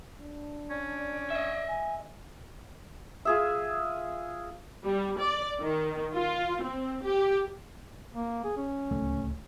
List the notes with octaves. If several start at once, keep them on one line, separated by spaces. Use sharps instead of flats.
D4
C#4 D5
D#5 E5
G#5
F4 G#4 E5
G3
D5
D#3
F4
C4
G4
A#3
G#4
C#4
D1 C#2 A3